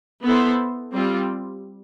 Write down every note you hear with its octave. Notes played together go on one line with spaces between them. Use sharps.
B3 E4 A4 C5
G3 C4 F4